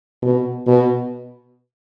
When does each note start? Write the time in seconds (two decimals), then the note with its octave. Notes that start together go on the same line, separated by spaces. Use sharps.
0.22 B2
0.67 B2